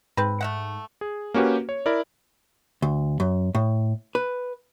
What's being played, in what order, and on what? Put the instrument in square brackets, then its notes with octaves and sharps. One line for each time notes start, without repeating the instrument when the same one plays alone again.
[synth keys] G#2 [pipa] C4 B4
[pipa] A3 E5 F#5
[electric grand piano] G#4
A#3 C#4 F#4 G4 B4
C#5
E4 A#4 D5
[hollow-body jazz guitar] D2
F#2
A2
B4